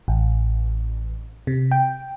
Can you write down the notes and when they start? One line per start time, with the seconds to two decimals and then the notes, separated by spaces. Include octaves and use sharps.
0.08 A1
1.47 C3
1.71 G5